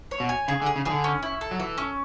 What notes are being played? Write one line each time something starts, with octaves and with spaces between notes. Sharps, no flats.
C#5
B2
G#5
C#3 G#4
D3
G#4
C#3
D3 E3 G#4
C#4
E4
A4
F#3
E3 A4
C#4